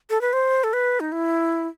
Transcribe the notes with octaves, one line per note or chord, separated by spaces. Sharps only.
A4
B4
C5
A4
B4
D#4
E4